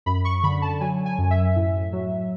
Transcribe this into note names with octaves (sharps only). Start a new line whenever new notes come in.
F#2 B5
C#6
D3 B5
A5
F#3 G#5
G#5
F#2
E5
A2
F#3